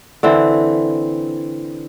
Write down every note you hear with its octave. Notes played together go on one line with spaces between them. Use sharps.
D3 E3 C4